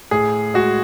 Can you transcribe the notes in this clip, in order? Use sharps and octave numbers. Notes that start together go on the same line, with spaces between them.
A2 G#4
G#3 F#4